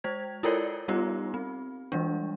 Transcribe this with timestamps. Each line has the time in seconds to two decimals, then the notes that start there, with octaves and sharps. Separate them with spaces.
0.04 G#3 C5 G#6
0.43 E4 F4 A4 A#4 C#5 D5
0.88 G3 B3 D#4 F4 G4
1.34 C4
1.92 E3 G3 G#3 D4